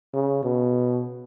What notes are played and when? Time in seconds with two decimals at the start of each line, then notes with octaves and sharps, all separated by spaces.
0.14 C#3
0.44 B2